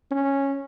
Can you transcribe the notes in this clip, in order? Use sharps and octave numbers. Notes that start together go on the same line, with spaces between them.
C#4